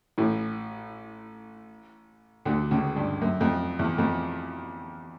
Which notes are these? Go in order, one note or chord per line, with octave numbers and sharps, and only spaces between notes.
A1 A2
D2 D3
C#2 C#3
G2
F#2
F2
E2
F2